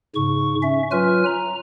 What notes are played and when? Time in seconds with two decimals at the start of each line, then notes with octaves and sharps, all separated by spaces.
0.15 G#2 C#3 C#6
0.63 C#4 E5
0.91 F#3 F4 B4 G#5 F6
1.26 A#5